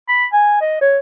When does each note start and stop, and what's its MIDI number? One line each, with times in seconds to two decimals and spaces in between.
0.08 0.25 83
0.33 0.61 80
0.61 0.79 75
0.81 0.98 73